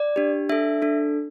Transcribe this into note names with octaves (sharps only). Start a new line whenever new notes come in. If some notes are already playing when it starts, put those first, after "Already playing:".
Already playing: D5
D4 G4
D4 A4 E5
D4 A4